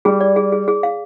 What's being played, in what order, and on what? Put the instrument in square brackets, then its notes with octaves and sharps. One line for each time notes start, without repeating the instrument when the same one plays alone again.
[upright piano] G3 [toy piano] G#4
[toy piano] D5
G#4
G#4
G#4
F5